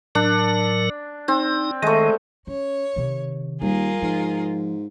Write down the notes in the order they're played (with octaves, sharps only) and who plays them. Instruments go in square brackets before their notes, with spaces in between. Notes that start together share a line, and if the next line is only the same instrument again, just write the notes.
[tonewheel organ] A2 F#3 A#4 [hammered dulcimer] D4
[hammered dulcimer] C4 [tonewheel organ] D#4
[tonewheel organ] D#3 [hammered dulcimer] G#3 A3
[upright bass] C#4 [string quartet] C#5
[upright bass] C3 D#3
[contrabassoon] D#2 [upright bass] G3 [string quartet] F4 G#4 A#4
[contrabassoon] G#2 [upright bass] F3